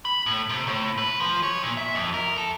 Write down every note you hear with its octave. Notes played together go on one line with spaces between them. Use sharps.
B5
A2
C3
A2
B4
F3
C#5
A#2
E5
F2
A#4
A4